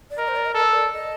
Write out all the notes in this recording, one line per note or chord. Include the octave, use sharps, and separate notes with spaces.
D5
A#4 D#5
C5
D5
D#5
A4 A#4
D5
D#5